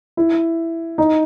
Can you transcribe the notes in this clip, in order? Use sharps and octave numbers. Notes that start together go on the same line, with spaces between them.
E4
D#4